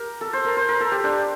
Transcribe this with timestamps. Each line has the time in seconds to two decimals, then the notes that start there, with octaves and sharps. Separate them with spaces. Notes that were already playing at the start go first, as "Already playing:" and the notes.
Already playing: G4 A#4
0.21 A4
0.33 C5
0.45 A#4
0.57 C5
0.69 A#4
0.80 A4
0.92 G4
1.04 D4